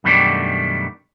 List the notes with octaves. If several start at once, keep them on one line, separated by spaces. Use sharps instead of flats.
F#2 B2 D#3 G3 A3 D4